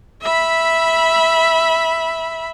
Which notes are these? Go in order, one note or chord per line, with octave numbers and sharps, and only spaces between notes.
E5 B5